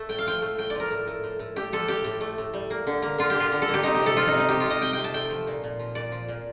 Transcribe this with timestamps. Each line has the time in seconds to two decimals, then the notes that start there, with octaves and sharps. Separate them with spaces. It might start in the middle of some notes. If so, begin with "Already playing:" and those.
Already playing: A3 A5
0.09 A2 G5
0.18 F5
0.27 F3 G5
0.42 A3
0.58 A2 G5
0.70 F3 D5
0.80 A#4
0.91 A2
1.07 A2
1.24 A2
1.39 A2
1.56 A3 G4
1.73 F3 A4
1.88 A2 G4
2.04 A2
2.21 A3
2.38 A2
2.53 G3
2.70 A#3
2.87 D3
3.02 A#3
3.18 D3 F4
3.30 G4
3.35 D3
3.40 F4
3.52 D3
3.62 A4
3.68 A#3
3.74 G4
3.83 C4 D#4
3.94 G4
4.01 C3
4.06 A4
4.17 F3 F4
4.28 D#4
4.33 C3
4.39 D#4
4.49 C3 G4
4.60 F4
4.66 C3 D#5
4.81 C3 G5
4.93 C3 G5
5.04 A5
5.14 A3 G5
5.30 F3
5.47 A#2
5.64 A#2
5.79 F3
5.95 A#2 D5
6.12 F3
6.28 A#2